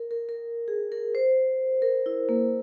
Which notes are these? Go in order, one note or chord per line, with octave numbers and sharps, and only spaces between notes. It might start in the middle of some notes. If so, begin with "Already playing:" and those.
Already playing: A#4
A#4
A#4
G#4
A#4
C5
A#4
E4
A#3